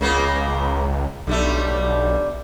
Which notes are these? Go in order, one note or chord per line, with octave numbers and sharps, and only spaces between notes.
C#2 C#3 A#3 B3
B1 D3 G3 A3